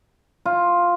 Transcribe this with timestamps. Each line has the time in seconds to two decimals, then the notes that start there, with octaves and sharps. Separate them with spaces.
0.45 F4